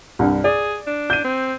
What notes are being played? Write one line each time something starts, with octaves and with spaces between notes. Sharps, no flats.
C2 G2
G#4 D5
D4
G6 D#7
C4